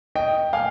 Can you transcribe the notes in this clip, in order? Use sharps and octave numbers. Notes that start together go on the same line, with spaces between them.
D#5 G5
F5 G#5